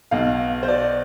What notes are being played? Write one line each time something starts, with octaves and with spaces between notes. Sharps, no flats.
B1 B2 F5
C5
D5